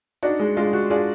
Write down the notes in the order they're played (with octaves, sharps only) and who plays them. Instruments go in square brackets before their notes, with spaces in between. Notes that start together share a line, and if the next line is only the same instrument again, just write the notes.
[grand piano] D4 [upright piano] D#4 F#4
[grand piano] G#3
[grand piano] G#3 [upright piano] D4 F4
[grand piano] F#4
[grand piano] D4 [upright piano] F4 G#4